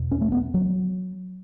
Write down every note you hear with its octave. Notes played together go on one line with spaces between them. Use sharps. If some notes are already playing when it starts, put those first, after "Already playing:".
Already playing: E2 B2
C#4
A3
B3
F#3